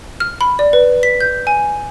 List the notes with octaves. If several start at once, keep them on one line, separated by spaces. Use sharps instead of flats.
F6
B5
D5
B4
B6
G6
G#5